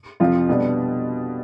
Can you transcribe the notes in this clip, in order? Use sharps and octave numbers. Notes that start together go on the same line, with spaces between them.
F2 C3 F3 C4 F4
B2 G3 B3 D4